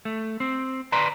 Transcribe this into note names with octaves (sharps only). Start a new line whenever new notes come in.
A3
C4
B4 D5 A#5 C6